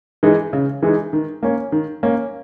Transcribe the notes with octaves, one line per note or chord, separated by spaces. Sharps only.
E3 G#3 D#4
C#3
E3 G#3 D#4
D#3
A#3 C#4
D#3
A#3 C#4